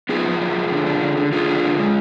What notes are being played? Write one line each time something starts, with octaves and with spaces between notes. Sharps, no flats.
B3 F4 G#4
F2
F#3
F2
D3
D4
D3
D3
D3 F4 G#4
D4
D3
G#3